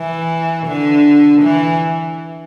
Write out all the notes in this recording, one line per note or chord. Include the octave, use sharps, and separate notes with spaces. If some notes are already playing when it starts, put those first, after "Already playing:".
Already playing: E3
D3
E3